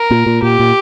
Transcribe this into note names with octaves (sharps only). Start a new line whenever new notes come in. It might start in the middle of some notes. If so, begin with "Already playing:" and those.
Already playing: A#4
A#2
A#2
A#2 G4
A#2